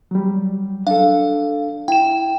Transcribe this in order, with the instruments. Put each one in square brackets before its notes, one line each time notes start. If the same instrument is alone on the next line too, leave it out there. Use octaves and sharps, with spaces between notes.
[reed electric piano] F#3 G3
[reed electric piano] D4 A4 [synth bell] F5
[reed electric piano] E4 [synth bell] G5 E7